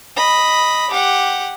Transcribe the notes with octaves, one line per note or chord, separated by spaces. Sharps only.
D#5 B5
G4 F#5